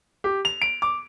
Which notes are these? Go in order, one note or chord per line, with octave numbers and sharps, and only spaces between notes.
G4
F7
D7
D6